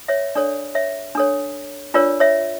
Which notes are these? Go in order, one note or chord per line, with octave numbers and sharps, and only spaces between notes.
C#5 E5
D4 A4 C#5 D5
C#5 E5
D4 A4 C#5
D4 F4 A#4 C#5 D5
C#5 E5